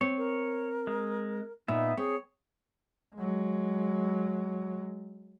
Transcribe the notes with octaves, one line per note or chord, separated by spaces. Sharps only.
C4 C#5
A#4
G#3
A#2 B3 D#4 E5
C4 G#4 C#5
F#3 G#3